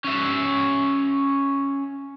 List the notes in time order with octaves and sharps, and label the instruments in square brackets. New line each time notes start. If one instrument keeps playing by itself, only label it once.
[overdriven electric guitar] C#4 E5